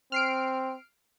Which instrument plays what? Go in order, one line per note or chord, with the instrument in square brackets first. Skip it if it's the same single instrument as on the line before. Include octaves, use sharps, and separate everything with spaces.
[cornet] C4 [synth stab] F6 C7 D7